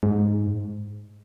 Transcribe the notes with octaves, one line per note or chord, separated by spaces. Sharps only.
G#2